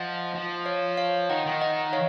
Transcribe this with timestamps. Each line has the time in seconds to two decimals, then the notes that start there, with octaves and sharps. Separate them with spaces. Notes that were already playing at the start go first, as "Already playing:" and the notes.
Already playing: F3 D#5 F#5
0.34 F3
0.66 C#5 F5
0.97 C#5 F5
1.29 D#3 D#5 F#5
1.46 D#3
1.61 D#5 F#5
1.93 C#5 F5